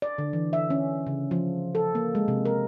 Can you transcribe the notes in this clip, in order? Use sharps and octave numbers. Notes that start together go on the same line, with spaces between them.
D5
D3
E3
E5
C#4
C#3
F3
A4
A#3
G#3
C3
A#4